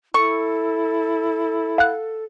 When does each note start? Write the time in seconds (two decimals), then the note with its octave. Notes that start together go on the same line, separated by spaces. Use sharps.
0.14 E4 A4 C#6
1.78 F5 F#5 F#6